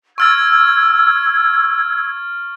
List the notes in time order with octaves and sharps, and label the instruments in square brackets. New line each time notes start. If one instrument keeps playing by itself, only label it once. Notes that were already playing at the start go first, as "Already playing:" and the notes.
[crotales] C#6 F6 A6 [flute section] E6 G#6